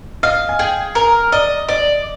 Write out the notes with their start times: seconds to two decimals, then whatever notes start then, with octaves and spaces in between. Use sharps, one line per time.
0.23 D#5 F5
0.49 G#5
0.59 G#4 G5
0.95 A#4 A#5
1.32 D5 D#5
1.69 D5 D#5